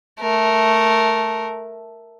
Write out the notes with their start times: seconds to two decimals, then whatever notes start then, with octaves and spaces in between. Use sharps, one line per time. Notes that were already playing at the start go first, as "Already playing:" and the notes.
0.20 A3 A#4